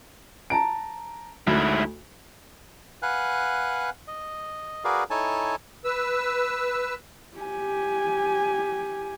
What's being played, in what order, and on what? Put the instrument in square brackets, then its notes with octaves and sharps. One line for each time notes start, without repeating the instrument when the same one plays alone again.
[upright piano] A5 A#5 D7
[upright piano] D2 [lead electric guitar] G#2 E4
[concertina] B4 F5 F#5 G#5 F#6
D#5
F#4 G#4 A#4 B4 D5 F5
D#4 E4 A4 C#5 G#5 A5
[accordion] B4 E6
[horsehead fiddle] G4 G#5